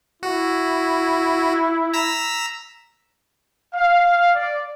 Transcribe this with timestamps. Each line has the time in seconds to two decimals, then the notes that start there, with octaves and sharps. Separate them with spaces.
0.23 E4 F#4
1.94 A#5 E6 B6
3.74 F5
4.35 D5